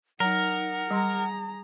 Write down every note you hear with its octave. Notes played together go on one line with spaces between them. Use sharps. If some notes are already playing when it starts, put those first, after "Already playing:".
F#3 D#4 A#4 F#5 A#5
G3 G#4 A#5 C6